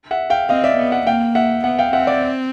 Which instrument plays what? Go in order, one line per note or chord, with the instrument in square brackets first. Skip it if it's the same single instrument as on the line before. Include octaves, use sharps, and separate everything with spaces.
[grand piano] E5 F#5
F5 G5
[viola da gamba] C4 [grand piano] D#5 F5
[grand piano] D5 E5
[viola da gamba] B3
[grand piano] E5 F#5
[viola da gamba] A#3 [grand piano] F5 G5
[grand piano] E5 F#5
[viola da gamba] B3 [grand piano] E5 F#5
[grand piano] F5 G5
[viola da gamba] C4 [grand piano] E5 F#5
[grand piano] D5 E5